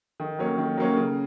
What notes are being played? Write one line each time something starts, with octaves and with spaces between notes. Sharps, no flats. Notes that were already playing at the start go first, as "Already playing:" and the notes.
D#3
F#3 A#3 C#4
D#3
F#3 A#3 C#4
C#3